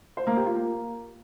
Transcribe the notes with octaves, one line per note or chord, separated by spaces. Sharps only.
C5
A#3
G4
F4
A#3